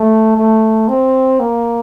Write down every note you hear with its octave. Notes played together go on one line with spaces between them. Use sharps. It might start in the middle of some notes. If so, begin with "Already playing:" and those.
Already playing: A3
A3
C4
A#3